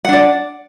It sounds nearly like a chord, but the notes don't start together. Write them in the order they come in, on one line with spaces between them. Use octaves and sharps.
F#5 D4 D5